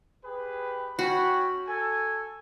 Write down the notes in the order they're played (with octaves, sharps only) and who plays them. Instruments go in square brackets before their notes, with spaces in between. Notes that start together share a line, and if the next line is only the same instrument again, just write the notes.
[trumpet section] G4 G#4 B4
[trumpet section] C#4 G5 B5 [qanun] F#4
[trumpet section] A4 G#5